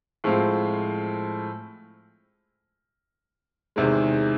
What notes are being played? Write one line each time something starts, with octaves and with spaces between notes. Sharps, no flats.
A2 F3 G#3 C4 F4
E2 C3 D#3 G#3